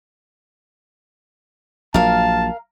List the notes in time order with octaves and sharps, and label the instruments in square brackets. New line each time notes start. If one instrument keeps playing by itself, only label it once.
[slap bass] A#1 A#2 F#3 [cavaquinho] A#4 F5 [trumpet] A5